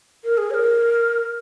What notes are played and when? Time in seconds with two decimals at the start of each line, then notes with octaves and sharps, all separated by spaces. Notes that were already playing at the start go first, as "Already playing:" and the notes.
0.24 A#4
0.38 G#4
0.50 C#5
0.54 A#4